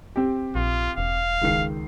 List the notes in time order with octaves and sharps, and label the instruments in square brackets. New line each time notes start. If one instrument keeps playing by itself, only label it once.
[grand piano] C4 G4
[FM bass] A#1 [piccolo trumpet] F4
[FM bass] E1 [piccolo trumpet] F5
[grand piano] C#2 D#3 C7